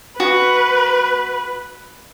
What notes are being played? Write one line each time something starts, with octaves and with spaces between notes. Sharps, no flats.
F#4 B4